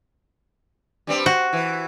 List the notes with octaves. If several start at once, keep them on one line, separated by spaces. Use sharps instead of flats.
G2 G3 C4
F#4 C5
E3